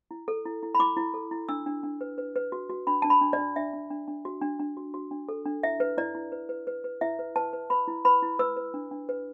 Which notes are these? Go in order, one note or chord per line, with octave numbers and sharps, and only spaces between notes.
E4
A4
E4
E4
B5
E4 D6
E4
A4
E4
D4 E6
D4
D4
B4
B4
B4
F#4
F#4
D4 B5
D4 A5
B5
D4
D5
D4
D4 E5
D4
D4
D4
F#4
D4
D4
F#4
F#4
D4
A4
D4
E4 E5
B4
E4 D5
E4
B4
B4
B4
B4
E4 E5
B4
B4 A5
B4
B4 B5
E4
B4 B5
E4
B4 E6
B4
D4
D4
B4